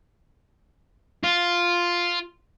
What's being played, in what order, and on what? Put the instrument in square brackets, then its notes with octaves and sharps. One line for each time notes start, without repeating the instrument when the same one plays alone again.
[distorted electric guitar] F4